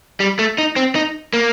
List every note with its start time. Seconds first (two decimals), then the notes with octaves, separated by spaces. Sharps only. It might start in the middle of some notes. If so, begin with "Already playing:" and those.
0.20 G3
0.39 A3
0.58 D#4
0.76 C4
0.95 D#4
1.33 A#3